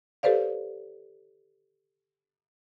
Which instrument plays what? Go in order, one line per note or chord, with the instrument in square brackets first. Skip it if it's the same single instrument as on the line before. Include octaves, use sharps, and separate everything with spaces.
[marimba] G4 A4 B4 C5 D5 F5